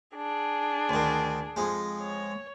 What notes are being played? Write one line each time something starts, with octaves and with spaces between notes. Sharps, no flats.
D4 G#4
D2 D#3
F2 G#3
C#5